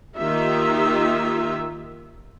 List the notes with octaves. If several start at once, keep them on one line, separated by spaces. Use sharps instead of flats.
D#3 A#3 D#4 F4 G4 E5